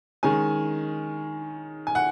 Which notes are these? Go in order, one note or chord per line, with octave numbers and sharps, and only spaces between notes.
D#3 G#3 C#4 G#5
G#5
F#5